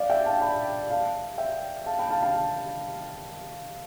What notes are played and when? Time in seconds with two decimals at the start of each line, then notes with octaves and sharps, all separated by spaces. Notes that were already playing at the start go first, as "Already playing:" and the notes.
Already playing: D5 F5
0.10 E5 G5
0.26 F5 A5
0.41 G5 B5
0.90 F5 A5
1.38 E5 G5
1.86 F5 A5
1.99 G5 B5
2.10 F5 A5
2.22 F5 A5